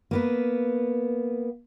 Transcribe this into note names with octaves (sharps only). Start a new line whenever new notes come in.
A#3 B3 B4